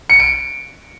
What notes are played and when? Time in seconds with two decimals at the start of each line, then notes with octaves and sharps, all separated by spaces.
0.10 C#7
0.20 D7